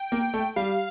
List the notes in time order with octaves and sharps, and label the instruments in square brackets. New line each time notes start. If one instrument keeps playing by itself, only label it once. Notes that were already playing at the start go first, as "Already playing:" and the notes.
Already playing: [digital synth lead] G5
[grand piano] A#3
A3
[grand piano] G3 [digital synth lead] F5